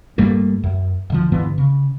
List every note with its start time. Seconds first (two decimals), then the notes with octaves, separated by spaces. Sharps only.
0.18 G2 G3 A3 A#3
0.64 F#2
1.10 D1 D3 F3
1.32 G2 D3 E3 B3
1.58 C#3